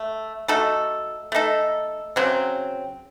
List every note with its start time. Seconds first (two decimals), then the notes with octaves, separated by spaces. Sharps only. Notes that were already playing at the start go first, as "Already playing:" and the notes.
Already playing: A3
0.48 A3 D#4 F#4 A4
1.32 A3 D#4 A4
2.16 C#3 F#3 C4